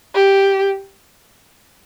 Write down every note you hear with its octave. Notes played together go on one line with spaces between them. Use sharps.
G4